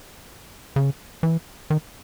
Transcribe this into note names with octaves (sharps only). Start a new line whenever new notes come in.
C#3
E3
D#3